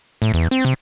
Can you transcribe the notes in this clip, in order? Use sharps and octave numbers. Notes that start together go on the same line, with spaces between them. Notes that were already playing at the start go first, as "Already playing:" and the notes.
A2
E2
C4
C3